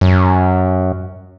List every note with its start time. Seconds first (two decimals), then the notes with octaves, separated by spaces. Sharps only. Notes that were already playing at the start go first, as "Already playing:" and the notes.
0.01 F#2